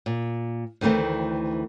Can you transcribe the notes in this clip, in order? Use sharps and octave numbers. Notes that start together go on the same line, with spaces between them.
A#2
D2 D#3 E3 A3 C4